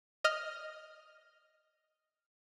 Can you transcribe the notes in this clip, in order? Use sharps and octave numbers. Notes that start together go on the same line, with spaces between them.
D#5 F6